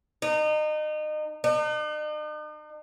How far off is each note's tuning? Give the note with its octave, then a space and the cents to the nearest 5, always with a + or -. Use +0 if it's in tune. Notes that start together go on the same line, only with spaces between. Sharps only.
D#4 -30
D#4 -45